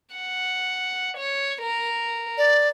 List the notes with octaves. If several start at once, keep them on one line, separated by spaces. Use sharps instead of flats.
F#5
C#5
A#4
D5